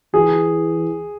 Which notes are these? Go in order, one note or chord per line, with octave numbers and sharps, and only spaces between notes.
E3 G#4